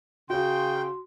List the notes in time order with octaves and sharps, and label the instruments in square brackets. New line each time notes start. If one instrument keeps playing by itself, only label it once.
[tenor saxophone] C#3 [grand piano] F#4 [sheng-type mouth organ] G5 [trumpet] C6